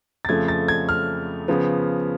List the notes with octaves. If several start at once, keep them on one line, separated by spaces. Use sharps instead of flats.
A6
F2 C#3 F3 A3 G#6
A6
G#6
F6
C#3 F3 B3